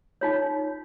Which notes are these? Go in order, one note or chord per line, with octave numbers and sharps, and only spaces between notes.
D#4 F4 C#5